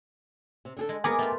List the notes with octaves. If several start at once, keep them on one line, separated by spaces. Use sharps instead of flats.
C3
D3 G#4 A4
G#3
G#3 A#3 B3 G#4 A#4 B4 G#5 D6
A3 F4 G4